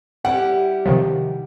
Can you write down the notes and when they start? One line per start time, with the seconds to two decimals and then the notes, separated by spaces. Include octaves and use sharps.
0.25 G3 E4 G4 F#5
0.86 C3 D#3 F3